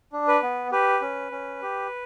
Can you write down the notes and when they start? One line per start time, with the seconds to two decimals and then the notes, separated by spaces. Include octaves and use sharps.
0.13 D4
0.28 B4
0.43 B3
0.72 G4 B4
1.02 C#4
1.32 C#4
1.62 G4